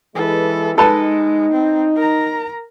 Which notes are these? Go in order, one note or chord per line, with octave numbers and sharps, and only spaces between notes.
E3 G#3 A4 B4
G#3 D#4 A4 B4 A5
C4
A#4 A#5